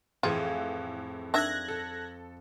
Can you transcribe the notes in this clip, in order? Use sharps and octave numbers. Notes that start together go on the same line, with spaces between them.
F2 A2 E3 F4 G#4
D#3 D4 E5 F#6 G#6 A#6
A4